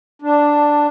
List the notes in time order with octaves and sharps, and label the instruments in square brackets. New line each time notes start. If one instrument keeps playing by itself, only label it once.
[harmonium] D4